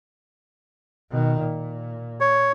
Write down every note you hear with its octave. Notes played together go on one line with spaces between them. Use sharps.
B2 D#3
A#2
C#5